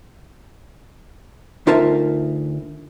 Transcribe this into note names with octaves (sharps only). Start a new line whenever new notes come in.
D2 D#4 F4 A#4 E5 A5